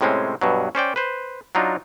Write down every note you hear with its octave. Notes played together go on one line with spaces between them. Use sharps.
A2 C3 G#3 C4 C#4
G2 B2 F#3
C#4 C5 D5 G5
B4 C5
F#3 D4 D#4 F4